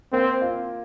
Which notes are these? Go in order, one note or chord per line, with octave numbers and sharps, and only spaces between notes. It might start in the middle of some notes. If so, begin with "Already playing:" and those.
A#3 C4
F4